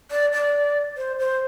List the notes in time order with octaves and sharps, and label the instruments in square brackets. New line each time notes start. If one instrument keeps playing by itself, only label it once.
[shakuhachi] D5
D5
C5
C5